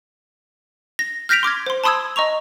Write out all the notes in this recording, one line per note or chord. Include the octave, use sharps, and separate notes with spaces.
A#6
F6 G6 A#6 B6 D7 F7
C6 D6 F6 G#6
C5 C6
A5 B5 C6 D#6 E6 G#6
D#5 A#5 C#6 F7